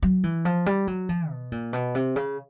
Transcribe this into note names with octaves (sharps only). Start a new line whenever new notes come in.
F#3
E3
F3
G3
F#3
F3
B2
A#2
B2
C3
C#3